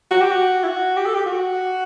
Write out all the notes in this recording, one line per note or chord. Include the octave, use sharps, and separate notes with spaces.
F#4
G4
F#4
E4
F#4
G4
A4
G4
F#4